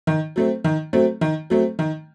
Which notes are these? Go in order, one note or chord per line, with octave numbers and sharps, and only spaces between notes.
D#3
F#3 A3 C4
D#3
F#3 A3 C4
D#3
F#3 A3 C4
D#3